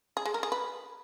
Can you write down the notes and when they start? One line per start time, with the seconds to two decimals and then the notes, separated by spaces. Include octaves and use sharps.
0.17 G#4
0.25 G#3
0.34 A#4
0.43 G#4
0.52 B4